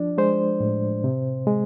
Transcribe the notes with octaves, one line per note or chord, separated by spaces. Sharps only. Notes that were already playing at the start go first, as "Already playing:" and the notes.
Already playing: F3 D4 D5
G#3 C5
A2
C3
G#3